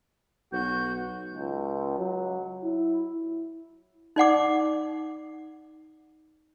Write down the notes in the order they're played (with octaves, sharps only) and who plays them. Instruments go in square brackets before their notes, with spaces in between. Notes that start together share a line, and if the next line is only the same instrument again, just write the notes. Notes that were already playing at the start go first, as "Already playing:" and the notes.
[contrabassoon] B1 [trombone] F#4 [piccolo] G6
[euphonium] C#2
F#3
E4
[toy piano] D#4 D5 F#5 D6